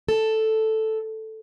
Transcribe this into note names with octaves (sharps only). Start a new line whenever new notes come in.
A4